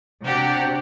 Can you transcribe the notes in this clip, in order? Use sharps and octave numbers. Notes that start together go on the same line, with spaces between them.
C3 D4 F#4 G4